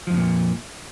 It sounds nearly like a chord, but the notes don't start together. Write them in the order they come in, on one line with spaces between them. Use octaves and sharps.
F3 F2 C#3 A#2